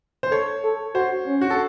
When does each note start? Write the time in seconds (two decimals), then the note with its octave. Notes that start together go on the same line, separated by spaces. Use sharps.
0.23 C5
0.31 A4 C#5
0.64 A4
0.95 F#4 C5
1.27 C#4
1.41 F#4
1.50 A4